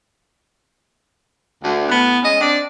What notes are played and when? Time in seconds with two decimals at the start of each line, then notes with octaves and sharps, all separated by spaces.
1.63 D2
1.89 A2 B3
2.23 G#3 C#4 D#5
2.40 C4 D4 D5